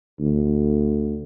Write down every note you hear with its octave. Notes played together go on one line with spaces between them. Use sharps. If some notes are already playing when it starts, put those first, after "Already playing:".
D2